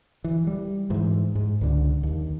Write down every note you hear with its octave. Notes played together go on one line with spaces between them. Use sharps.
E3
G3
G#2 E3
G#2
C#2 D3
D#2